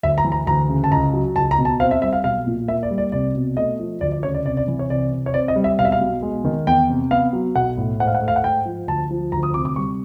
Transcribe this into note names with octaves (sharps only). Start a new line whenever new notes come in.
D2 E5
A#5
E3
A#5
D2 A#5
C#3
A5
C#2 A#5
F#3
C#2 A5
A#5
B2
A5
C4 F5
E5
G3 E5
F5
B1 F5
A#2
A#3 E5
D5
G3
D5
C2 D5
B2
A3 D#5
F3
D2 D5
D5
C#3 C#5
D5
C2 D5
D5
E3
C#5
C2 D5
C3
C#5
C4 D5
D#5
G3
E5
B1 F5
E5
F5
B2
G#3
D#3
E2 G5
C3
B3 F5
F#3
B1 F#5
A2
G#2 F#5
F5
F#5
A3
F5
F#5
G#2 G5
F3
D2 A5
F3
D2 A#5
D#6
C3 D6
D6
G3 C#6